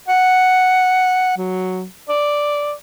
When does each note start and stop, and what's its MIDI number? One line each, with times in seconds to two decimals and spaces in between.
0.08 1.34 78
1.37 1.84 54
2.09 2.73 74